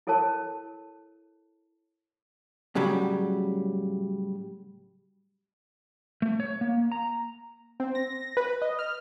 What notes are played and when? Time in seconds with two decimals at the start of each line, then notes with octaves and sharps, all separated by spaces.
0.07 E4 A4 A#4 C#5 A5
2.75 A2 C#3 F#3 G3
6.22 A3
6.40 C#5
6.61 A#3
6.92 A#5
7.80 C4
7.95 A#6
8.37 B4
8.62 D#5
8.79 F6